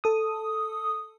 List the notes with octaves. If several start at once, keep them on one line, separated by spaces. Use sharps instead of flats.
A4 D#6